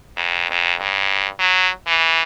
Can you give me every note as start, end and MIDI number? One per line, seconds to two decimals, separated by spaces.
0.17 0.46 41
0.51 0.74 41
0.80 1.27 43
1.40 1.69 54
1.87 2.22 52